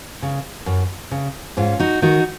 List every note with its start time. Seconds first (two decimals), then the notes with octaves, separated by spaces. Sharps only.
0.22 C#3
0.66 F#2
1.11 C#3
1.57 G#2 C#4 F4
1.79 D#4 F#4
2.02 D#3 D#4 F#4